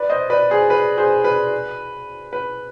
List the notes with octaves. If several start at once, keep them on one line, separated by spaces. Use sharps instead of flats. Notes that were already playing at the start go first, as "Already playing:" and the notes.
Already playing: B4 D5
C5 D#5
B4 D5
G#4 C5
B4
G#4 C5
B4
B4